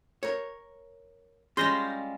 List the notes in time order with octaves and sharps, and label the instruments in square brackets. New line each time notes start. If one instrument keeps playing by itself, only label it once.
[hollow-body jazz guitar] A#4 C#5
[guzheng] G3 G#3 F4 [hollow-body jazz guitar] C#4 G#4 [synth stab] C6 G6 A#6